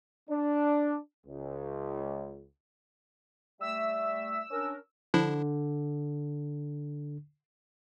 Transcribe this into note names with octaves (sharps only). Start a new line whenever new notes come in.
D4
C#2
G3 A3 E5 E6
C#4 D4 A#4
D3 F3 D4 E4